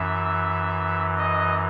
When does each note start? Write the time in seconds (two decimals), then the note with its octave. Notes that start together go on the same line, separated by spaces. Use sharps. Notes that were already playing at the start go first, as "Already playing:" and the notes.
Already playing: F#2 E3 E5
1.18 D#5